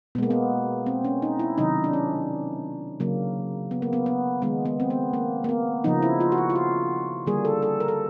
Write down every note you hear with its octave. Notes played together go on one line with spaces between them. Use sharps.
B2 G#3 A#3 B3
B3
C4
C#4
D#4
E4
C3 D#3 F#3 D#4
D4
C#4
C#3 F#3 A#3
B3
A#3
B3
B3
D#3 G#3 B3
B3
C4
B3
A#3
A#3
B3
C#3 F3 A#3 D#4
E4
F4
F#4
F4
F4
F#4
D3 G3 A#3 G#4
A4
A4
A#4
A4